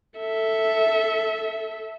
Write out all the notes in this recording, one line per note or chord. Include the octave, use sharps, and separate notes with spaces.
A4 E5